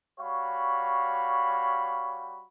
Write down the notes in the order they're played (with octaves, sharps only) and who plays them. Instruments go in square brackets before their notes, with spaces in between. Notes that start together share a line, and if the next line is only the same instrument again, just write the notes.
[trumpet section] G3 F#4 C#5 F5 B5